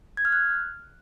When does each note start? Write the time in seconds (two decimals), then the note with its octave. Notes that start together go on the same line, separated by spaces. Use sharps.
0.17 G#6
0.25 F6
0.32 F#6